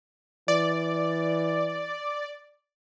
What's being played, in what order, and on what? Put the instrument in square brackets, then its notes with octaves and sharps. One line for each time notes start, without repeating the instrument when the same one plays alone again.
[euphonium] E3 [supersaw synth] D5